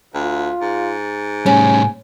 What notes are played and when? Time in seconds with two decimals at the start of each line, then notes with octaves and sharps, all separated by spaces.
0.14 D2 F4
0.61 G#2
1.46 A2 G3 C#4 G#5